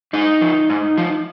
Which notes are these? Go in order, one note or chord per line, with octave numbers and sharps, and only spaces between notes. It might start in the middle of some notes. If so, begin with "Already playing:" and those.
G#2 D#4
F3
G#2
F3